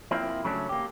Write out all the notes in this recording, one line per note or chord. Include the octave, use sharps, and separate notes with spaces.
F3 A#3 C4 E4
C#3 F#3 A3 C#4 D4
A#3 G4